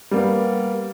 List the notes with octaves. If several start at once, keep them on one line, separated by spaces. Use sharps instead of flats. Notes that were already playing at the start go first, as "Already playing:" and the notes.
G3 A#3 B3